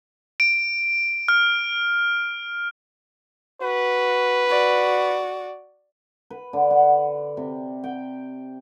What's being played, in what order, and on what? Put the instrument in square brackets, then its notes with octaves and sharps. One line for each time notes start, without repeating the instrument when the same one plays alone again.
[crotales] D7
F6
[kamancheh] F#4 [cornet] B4
[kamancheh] F#4 D5
[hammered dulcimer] B4
D3
F#5
C3
G5